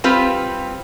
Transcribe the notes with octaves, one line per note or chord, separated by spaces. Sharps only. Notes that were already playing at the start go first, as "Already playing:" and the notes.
G3 C4 F4 G4 B4